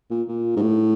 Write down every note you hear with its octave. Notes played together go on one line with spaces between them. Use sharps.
A#2
A#2
G#2
A2